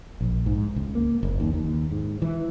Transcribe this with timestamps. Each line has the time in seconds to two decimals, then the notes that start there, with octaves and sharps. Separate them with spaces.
0.21 A#1
0.46 G#2
0.76 C#2
0.95 A#3
1.23 F#1
1.40 D#2
1.54 D#2
1.92 G#2
2.22 E3